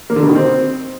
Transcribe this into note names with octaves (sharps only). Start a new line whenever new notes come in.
A#3
D3
B2
D#3
C4